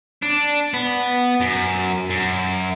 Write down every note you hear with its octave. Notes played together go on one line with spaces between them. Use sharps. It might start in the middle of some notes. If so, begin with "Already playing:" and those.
D4
B3
F#2
F#2